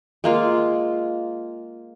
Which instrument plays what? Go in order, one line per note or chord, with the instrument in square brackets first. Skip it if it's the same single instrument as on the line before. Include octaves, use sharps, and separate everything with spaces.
[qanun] G#3 A#3 F4